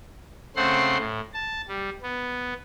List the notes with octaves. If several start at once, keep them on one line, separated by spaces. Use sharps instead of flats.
C#3 A3 C4 C5 F#5 C6
A2
A5
G3
B3